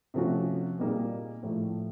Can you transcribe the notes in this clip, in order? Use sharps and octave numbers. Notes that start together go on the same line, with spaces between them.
C3 F3 A3 C#4 F#4
A#2 G3 A#3 D#4 G#4
A2 F3 A3